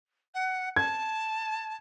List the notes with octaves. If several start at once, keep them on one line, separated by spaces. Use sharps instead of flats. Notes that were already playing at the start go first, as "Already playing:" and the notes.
F#5
A5 G#6